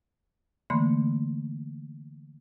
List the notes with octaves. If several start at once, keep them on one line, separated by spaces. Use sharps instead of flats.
D3 E3 A3 A#3 B5 C6